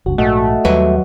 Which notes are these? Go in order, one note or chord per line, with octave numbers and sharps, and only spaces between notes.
F#1 C#2 G2 F#4
A#1 G#2 A3 F#4 D#5 F#5
D#2 F#3 G3 B4 E5